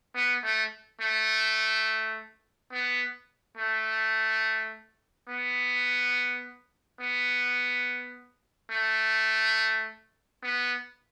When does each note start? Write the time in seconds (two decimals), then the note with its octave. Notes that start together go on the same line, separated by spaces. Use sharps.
0.15 B3
0.43 A3
1.01 A3
2.72 B3
3.57 A3
5.28 B3
7.00 B3
8.70 A3
10.43 B3